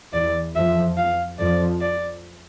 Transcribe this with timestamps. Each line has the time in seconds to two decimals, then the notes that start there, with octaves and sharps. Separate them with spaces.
0.13 E2 E3 D5
0.55 F2 F3 E5
0.97 F5
1.39 F2 F3 D5
1.81 D5